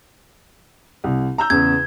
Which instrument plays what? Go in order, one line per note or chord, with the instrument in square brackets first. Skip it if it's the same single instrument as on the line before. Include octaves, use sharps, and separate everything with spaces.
[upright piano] C2
A#5 E6 G6
[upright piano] E2 C#3 [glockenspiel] G#6